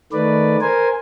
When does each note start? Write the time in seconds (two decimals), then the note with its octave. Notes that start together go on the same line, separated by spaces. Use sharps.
0.12 D#3 A3 B4 D5
0.61 A#4 C5 G#5